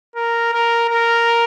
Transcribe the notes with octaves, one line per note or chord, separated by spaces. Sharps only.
A#4
A#4
A#4